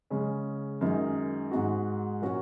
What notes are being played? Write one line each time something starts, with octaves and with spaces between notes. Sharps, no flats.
C#3 G#3 C#4
F#2 D#3 G#3 D#4
G#2 G#3 F#4
A#2 A#3 C#4 F#4